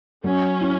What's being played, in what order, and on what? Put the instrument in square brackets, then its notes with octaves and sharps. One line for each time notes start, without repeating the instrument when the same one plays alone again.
[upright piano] F#3 [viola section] C#4
[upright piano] E4